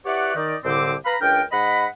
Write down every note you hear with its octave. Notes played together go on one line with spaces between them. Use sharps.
E4 G4 B4 C#5 D5 F#5
D#3 D#4 D5
C2 A2 D3 C4 C5 D6
B4 F5 A#5 B5
C#2 D4 A#4 G5
G#2 D#5 F#5 B5